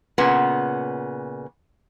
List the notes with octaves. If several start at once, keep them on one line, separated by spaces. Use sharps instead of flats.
A#2 C#3 B3